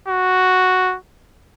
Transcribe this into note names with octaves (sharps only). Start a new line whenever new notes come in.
F#4